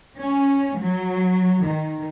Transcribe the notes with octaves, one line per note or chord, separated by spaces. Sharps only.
C#4
F#3
D#3